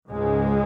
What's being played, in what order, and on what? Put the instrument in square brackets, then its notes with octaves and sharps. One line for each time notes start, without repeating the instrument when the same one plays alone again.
[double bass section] C#2 G#2 C#3 G#3